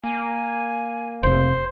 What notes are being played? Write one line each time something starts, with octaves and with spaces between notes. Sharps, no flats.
A#3 G#5
F1 C3 C5